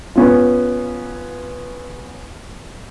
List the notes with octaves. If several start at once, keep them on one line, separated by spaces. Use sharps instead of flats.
B3 C#4 F4